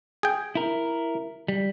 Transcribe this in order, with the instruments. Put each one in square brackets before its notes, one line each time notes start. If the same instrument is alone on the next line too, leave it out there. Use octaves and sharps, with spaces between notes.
[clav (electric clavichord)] G#4 G5
[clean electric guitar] E4 A#4
G3